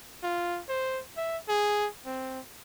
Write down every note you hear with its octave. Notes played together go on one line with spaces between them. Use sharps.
F4
C5
E5
G#4
C4